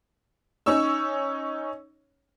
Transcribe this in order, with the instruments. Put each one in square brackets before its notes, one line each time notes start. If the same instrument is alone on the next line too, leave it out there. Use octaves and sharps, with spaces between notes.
[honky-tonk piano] C#4 D#4 C#5 C#6 E6